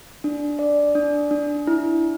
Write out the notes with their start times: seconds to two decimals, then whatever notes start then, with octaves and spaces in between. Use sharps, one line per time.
0.24 D4
0.59 D5
0.95 D4
1.31 D4
1.67 E4